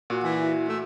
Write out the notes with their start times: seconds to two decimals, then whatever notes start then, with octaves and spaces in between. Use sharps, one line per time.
0.10 A#2 F#4 F#5
0.24 E3 G#5
0.40 E4
0.68 A3 E5